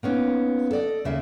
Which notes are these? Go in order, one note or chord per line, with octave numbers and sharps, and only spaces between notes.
A#3 B3 C#4 D#4
A4 D5 D#5
D#2 C#3 A#3 E5